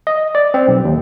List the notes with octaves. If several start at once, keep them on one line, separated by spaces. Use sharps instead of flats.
D#5
D5
C4
B1
D#2